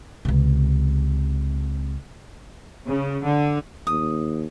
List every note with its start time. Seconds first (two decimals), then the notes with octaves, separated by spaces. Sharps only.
0.25 C#2 C3
2.87 C#3
3.23 D3
3.87 D#2 D#6